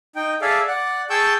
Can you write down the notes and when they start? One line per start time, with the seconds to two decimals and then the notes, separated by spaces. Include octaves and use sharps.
0.16 D#4 G5
0.42 G#4 A4 D5 E5 F5
0.67 D5 F#5
1.10 G#4 G5 A5 C#6 E6 G6